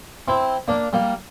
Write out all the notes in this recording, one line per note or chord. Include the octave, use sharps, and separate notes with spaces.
C4 E4
A#3 D4
G3 A#3